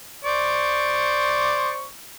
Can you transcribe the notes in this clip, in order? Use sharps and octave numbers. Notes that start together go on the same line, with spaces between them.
C5 D5 C#6